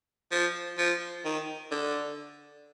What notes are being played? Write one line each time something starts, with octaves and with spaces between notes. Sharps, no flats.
F3
F3
D#3
D3